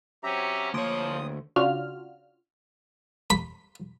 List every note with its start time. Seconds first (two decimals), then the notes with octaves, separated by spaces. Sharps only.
0.23 F#3 C4 C#4 G4 E5 A#5
0.74 D2 F3 A#3 C#5 C6 D#6 D7
1.56 C#3 D4 F4 F#4 F6
3.30 B5